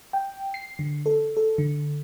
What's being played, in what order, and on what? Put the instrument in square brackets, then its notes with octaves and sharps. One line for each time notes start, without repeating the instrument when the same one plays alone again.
[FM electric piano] G5
C7
D3
A4
A4
D3